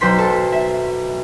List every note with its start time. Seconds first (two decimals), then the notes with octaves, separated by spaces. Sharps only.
0.01 B1 C5 C6 B6
0.19 A4
0.52 E5